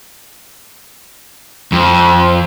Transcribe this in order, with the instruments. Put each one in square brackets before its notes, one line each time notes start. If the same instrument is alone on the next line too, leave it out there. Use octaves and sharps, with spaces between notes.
[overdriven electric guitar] F2